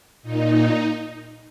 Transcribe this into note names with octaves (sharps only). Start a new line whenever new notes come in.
A#2 D#4